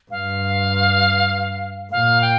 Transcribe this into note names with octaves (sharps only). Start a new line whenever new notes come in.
G2 F5
A#2 F5
G5